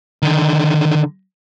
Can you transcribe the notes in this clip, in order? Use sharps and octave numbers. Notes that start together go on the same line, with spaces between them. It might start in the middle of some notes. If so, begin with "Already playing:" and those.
D3 D#3